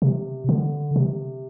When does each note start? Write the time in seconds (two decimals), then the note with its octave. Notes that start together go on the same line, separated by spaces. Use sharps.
0.02 C3
0.49 D3
0.96 C3